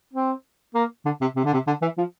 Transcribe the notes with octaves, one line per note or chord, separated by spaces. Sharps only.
C4
A#3
D3
C3
C3
D3
C3
D3
E3
F3